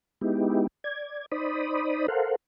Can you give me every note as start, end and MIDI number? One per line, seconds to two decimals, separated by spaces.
0.21 0.67 56
0.21 0.67 59
0.21 0.67 63
0.21 0.67 64
0.21 0.67 67
0.84 1.26 74
0.84 1.26 92
1.31 2.07 63
1.31 2.07 72
1.31 2.07 74
1.31 2.07 83
1.31 2.07 87
2.08 2.36 69
2.08 2.36 70
2.08 2.36 72
2.08 2.36 77
2.08 2.36 78